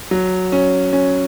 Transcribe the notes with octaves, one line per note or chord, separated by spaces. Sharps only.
F#3
C#4
C#4